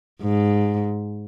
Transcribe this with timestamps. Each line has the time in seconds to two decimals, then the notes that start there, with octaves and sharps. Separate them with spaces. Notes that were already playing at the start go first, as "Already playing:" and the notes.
0.22 G#2